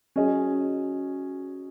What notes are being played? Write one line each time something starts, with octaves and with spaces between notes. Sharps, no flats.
F#3 C#4 G#4 D#5